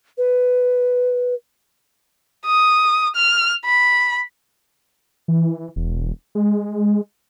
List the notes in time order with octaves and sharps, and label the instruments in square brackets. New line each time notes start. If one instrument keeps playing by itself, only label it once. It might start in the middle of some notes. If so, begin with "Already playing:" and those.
[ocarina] B4
[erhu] D#6
F6
B5
[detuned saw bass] E3
E1
G#3